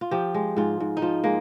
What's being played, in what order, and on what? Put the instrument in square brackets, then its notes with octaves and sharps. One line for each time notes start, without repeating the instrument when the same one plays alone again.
[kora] F4
F3 G4
G#3
G#2 F4
G#2
D#4
F3 F4
G#3 A#3